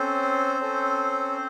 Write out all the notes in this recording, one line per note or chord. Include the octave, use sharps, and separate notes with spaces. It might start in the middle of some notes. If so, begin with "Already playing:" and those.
Already playing: C4 C#4 A4 C5
C#4 A4